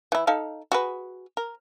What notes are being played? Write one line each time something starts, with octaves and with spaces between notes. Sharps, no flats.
E3 E4
D#4 A4 F5
F#4 G#4 B4
A#4